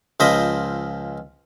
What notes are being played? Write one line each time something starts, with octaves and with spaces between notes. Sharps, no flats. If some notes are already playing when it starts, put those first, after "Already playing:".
C#2 F3 C5 D#5 B5